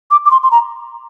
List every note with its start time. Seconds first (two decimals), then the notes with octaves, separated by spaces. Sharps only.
0.11 D6
0.26 D6
0.31 C6
0.43 C6
0.51 A#5